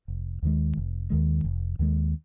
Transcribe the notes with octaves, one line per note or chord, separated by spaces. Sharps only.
F1
D#2 D#3 G#3
F1
D#2 D#3 G#3
F1
D#2 D#3 G#3